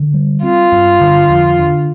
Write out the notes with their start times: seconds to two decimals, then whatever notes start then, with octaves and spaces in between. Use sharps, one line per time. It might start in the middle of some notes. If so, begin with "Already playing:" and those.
Already playing: D3
0.14 G3
0.42 C4 F4
0.72 G2
1.00 D3
1.29 F2
1.58 D3